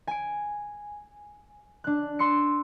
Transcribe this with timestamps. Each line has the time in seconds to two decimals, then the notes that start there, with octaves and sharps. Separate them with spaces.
0.07 G#5 D7
1.84 D4 F#6
2.19 C6 E6 C#7